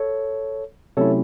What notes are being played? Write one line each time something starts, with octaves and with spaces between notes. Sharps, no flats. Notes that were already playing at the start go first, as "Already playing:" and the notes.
Already playing: A4 C#5
C3 F#3 A3 C#4 E4 A4 C#5